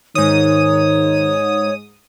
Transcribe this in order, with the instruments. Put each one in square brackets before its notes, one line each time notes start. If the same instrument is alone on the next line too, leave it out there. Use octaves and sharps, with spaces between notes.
[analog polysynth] G#2 D#6 [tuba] D#3 [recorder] C#5